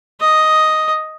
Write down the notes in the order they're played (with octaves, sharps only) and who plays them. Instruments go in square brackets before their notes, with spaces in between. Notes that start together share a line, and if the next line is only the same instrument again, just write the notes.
[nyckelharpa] D#5